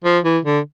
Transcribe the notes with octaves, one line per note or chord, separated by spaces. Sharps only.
F3
E3
D3